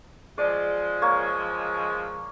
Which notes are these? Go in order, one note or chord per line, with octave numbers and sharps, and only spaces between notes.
F3 G#3 D5
A#3 C#5